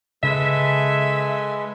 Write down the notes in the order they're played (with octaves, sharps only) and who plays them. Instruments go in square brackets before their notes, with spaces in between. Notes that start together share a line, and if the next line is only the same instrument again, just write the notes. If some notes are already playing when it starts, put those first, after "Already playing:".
[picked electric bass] C#3 [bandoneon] G#3 [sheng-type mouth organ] A4 B4 G#5 [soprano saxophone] E5